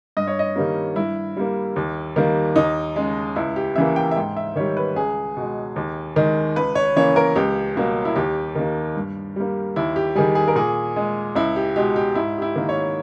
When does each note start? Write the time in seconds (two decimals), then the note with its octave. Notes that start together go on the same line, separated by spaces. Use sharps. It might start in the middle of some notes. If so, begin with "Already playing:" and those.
0.17 G2 D#5
0.27 C#5
0.39 D#5
0.56 D#3 G3 A#3
0.96 G2 E4
1.37 G3 A#3
1.76 D#2
2.16 D#3 G3 A#3
2.56 D#2 D#4
2.96 C#3 G#3
3.36 C#2 E4
3.56 G4
3.76 C#3 E3 A#3 E5
3.96 G5
4.11 E5
4.16 G#2 G5
4.37 E5
4.56 D#3 G3 C#5
4.77 B4
4.96 C#2 G#4
5.37 B2 G#3
5.76 D#2
6.16 D#3 G#3
6.56 C#2 B4
6.75 C#5
6.96 C#3 E3 A#3 C#5
7.16 A#4
7.36 C#2 G4
7.76 B2 G3 A#3
8.05 E4
8.16 D#2 G4
8.55 D#3 A#3
8.96 G2
9.36 G3 A#3
9.76 D#2 E4
9.96 G4
10.15 D#3 G3 G#4
10.35 G#4
10.48 A#4
10.56 A#2 G#4
10.96 G#3
11.35 C#2 E4
11.56 G4
11.76 B2 G#3 G4
11.96 G4
12.15 G#2 E4
12.38 G4
12.42 E4
12.56 D#3 A#3
12.69 C#5